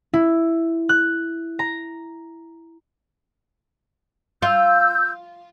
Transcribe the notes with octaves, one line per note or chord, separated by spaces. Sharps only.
E4
F#6
A#5
F4 E6 G6